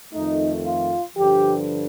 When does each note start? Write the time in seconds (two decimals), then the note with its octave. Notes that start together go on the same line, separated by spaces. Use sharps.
0.13 F2 D#3 A3 D#4
0.66 F4
1.17 G2 D3 F3 G4